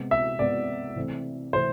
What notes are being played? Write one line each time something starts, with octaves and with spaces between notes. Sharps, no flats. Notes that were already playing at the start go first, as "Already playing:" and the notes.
Already playing: C3 G#3 B3
E5
C3 G#3 B3 D5
C3 E3 A3 C4
C3 E3 A3 C4 C5